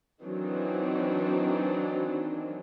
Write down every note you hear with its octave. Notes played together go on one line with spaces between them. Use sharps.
D#3 E3 F#3 C4 D4 D#4